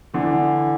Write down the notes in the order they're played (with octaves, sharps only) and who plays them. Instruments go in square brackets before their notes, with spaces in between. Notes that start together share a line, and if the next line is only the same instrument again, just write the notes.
[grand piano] D3 E3